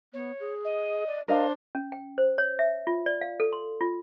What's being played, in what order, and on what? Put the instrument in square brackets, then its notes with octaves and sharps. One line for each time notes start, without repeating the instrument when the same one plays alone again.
[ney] B3 [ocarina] C#5
[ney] G#4
[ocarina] D#5
[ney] D5
[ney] D4 [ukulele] A#4 D#5 F5 [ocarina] C5
[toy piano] C#4
G5
C5
C#5
E5
F4
D5
F5
A4
C6
F4